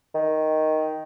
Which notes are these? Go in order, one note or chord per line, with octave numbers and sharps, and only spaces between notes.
D#3